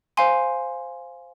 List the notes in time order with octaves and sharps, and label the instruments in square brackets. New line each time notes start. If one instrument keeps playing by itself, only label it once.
[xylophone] C5 F5 G#5 C6